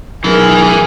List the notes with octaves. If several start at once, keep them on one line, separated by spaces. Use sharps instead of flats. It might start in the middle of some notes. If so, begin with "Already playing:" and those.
F#2 B2 E3 G#4 A#4